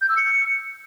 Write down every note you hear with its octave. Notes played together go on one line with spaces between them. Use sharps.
G6
E6
C#7